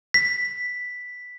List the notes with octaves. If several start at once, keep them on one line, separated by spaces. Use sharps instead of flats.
B6